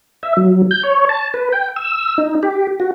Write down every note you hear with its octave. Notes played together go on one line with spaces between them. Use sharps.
E5
F#3
G6
C#5
A5
B4
G5
E6
D#4
G4
F#4